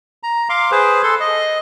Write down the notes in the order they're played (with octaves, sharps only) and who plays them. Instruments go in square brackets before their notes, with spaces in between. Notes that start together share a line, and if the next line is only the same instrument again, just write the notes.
[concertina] A#5
F5 C6 D6
G#4 B4 C5
A4 C6
D#5